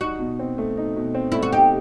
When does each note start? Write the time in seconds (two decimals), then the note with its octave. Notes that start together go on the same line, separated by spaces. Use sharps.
0.01 D#4 F#4
0.19 B2
0.39 C4
0.58 A3
0.77 D#4
0.96 B2
1.15 C4
1.32 A3 E4
1.43 F#4
1.53 D#4 G4